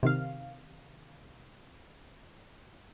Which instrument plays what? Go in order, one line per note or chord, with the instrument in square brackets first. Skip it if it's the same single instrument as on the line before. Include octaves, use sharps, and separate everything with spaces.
[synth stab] C3 D#3 F5